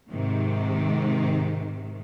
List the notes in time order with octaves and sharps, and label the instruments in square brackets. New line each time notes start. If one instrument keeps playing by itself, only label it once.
[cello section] G#2 C3 D#3